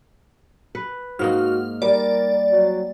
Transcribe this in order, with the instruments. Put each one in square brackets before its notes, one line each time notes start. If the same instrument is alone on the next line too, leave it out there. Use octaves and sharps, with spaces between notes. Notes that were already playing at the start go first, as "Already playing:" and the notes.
[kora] B4
[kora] G#2 A#3 D#4 [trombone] F#4 [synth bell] F6
[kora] G3 [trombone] A#4 [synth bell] D5
[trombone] F#3